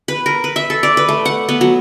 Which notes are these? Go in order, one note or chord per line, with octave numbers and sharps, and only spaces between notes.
B4
A#4
B4
E5
A4
D5
B4
A3
F#5
B3
F#3